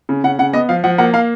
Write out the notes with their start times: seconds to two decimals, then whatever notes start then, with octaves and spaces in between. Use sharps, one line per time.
0.09 C#3
0.24 C#3 F#5
0.38 C#3 F#5
0.53 B3 D#5
0.69 F3 F5
0.84 F3 F#5
0.98 A#3 F#5
1.14 A#3 F5